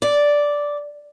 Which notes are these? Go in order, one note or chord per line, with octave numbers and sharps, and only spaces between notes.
D5